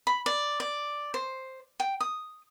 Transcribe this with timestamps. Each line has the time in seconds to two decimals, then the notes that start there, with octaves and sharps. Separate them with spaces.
0.07 B5
0.26 D5
0.60 D5
1.14 C5
1.80 G5
2.00 D#6